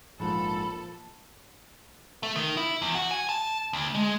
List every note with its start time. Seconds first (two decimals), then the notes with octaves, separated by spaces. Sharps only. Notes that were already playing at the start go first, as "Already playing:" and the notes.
0.20 A#1 G#2 F3 A#3 F4 A4 B5
2.23 A3
2.36 D#3
2.57 E4
2.82 E2
2.95 F#4
3.11 G#5
3.29 A5
3.73 D2
3.95 G#3